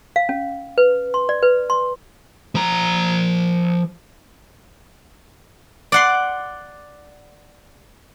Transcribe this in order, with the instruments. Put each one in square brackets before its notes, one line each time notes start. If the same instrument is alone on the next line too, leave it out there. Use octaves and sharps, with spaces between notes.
[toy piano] F5
C#4
B4
C6
D5
B4
C6
[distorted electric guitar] F3 A#5
[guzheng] D5 F#5 C6